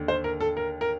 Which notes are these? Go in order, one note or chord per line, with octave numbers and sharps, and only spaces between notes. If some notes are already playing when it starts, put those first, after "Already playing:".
Already playing: D#2 D3
C5
A#4
A4
A#4
A#4